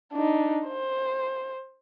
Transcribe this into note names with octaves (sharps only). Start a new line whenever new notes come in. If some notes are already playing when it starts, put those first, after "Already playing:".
D4 D#4
C5